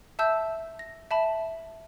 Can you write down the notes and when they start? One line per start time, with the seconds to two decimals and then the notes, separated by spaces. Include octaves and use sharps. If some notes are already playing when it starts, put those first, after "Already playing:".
0.19 E5 A5 E6 G6
0.79 A#6
1.11 E5 A5 B5